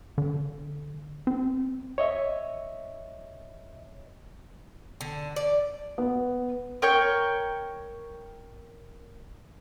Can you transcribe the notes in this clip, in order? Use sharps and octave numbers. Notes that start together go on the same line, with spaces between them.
D3
C4
C#5 D#5 E5
D3
D5
B3
A#4 C#5 G5 C#6